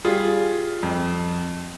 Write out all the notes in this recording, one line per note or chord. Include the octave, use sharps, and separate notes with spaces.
G3 F4 G#4
F2